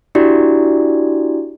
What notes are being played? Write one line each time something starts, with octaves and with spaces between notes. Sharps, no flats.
D4 E4 F#4 G4 D5